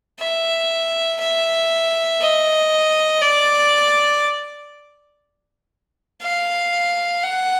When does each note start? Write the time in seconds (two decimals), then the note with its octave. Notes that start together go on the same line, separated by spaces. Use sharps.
0.20 E5
1.20 E5
2.20 D#5
3.21 D5
6.22 F5
7.23 F#5